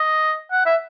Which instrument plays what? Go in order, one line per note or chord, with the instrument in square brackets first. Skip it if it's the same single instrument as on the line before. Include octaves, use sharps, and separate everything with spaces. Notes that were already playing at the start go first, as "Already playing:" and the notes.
Already playing: [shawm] D#5
F#5
E5